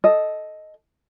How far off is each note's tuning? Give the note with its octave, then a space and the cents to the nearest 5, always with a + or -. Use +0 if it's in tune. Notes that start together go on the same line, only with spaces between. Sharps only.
A4 -10 D#5 +0